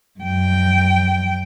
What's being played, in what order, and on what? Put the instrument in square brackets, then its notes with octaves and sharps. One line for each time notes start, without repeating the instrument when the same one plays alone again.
[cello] F#2 G5